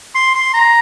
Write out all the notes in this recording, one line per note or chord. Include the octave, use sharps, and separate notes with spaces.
C6
C6
A#5